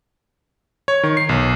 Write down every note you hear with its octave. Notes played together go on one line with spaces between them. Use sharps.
C#5
D#3
C7
B1